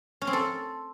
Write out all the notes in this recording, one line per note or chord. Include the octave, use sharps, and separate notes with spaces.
C#4
C4
A4